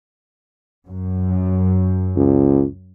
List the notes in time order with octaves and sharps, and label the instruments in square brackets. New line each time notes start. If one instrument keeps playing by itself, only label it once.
[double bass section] F#2
[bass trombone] C#2